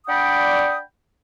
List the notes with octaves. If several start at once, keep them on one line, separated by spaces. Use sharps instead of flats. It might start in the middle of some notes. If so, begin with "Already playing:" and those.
D4 D5 F#5 G5 B5 D#6